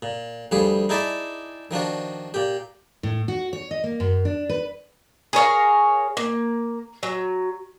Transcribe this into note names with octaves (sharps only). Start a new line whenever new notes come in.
A#2
D2 F3 G3 G#4 B4
D#4 E4 G#4 D5 A5 B5
D#3 F3 D4 F#4
A#2 G4
A2
F#4
C#5
D#5
A#3
F#2
D4
B4
G#4 A#4 C#5 F5
A#3
F#3